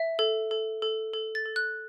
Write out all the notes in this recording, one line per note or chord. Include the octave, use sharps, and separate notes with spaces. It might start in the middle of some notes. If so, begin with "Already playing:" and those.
Already playing: E5
A4
A4
A4
A4
A6
A4
F#6